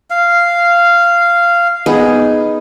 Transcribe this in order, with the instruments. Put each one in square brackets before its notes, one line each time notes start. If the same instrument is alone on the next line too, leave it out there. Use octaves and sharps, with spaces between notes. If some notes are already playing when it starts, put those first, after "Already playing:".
[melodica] F5
[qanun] B3 D#4 G#4